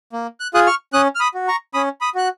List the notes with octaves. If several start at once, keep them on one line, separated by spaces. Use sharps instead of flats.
A#3
F#6
F4 G#4 D#6 F#6
C#6 F6
C#4 D#6 F#6
F6
B5 D#6
F#4
A#5 C#6
C#4 B5 D#6
B5 D#6
F#4 F#6